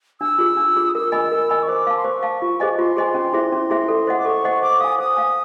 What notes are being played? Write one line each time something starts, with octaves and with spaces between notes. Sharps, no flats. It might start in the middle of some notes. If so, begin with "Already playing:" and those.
D4 E6
F4 G#4
D4
F4 G#4
D#6
A#4 E6
D#5 G#5 B5
A#4
D#5 G#5 B5
C#6
C5 D6
F5 A5
C6
C5 C#6
F5 A5
F4
G#4 C5 D#5 G#5
F4 C6
G#4 C5 D#5 G#5
C#4
E4 G#4 C5 E5
C#4
E4 G#4 C5 E5
A4
C5 D#5 F#5
D6
A4 C#6
C5 D#5 F#5
C5 D6
F5 G#5 D#6
C5 D#6
F5 G#5